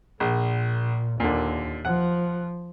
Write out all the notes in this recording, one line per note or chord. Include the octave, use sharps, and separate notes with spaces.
A#1 A#2
D#2 A#2 D3
F3 F#5